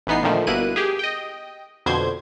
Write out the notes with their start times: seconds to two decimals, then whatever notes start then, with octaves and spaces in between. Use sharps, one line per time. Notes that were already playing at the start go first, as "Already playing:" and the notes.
0.07 A1 E3 B3 D#4 C7
0.23 A#2 D3 D#3 F3 A3
0.47 G1 B2 A#3 E4 F#6 D#7
0.76 G4 G#4
0.99 D#5 G5
1.86 F2 B2 D3 C5 G6 G#6